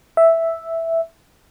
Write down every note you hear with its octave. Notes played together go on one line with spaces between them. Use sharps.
E5